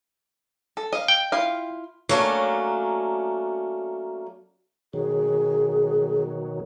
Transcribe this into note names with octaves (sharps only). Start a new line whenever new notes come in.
A4
D#5 F5
G5
E4 F4 F5
F#3 A3 A#3 C#4 D4
B2 D#3 F#3 G#4